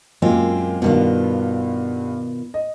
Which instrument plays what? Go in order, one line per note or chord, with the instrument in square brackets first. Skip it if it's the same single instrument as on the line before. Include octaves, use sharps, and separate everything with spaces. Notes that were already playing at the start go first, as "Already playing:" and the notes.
[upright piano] F#2 A#2 A#3 [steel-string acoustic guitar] G#3 C4 F4
[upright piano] G2 B3 [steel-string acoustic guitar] B2 D#3 F4
[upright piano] D#5